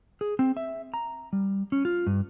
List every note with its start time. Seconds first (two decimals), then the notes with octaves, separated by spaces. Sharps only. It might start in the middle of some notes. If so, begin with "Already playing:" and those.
0.21 G#4
0.39 C4
0.57 E5
0.94 A#5
1.33 G3
1.72 C#4
1.85 F4
2.07 G2